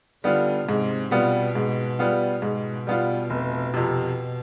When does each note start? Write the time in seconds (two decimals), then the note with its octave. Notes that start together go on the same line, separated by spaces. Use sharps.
0.24 D3 G3 B3 F4
0.68 G#2 C3
1.11 B2 G3 B3 F4
1.55 G#2
1.99 G3 B3 F4
2.42 G#2 B2
2.87 G3 B3 F4
3.30 F1
3.74 F2 C3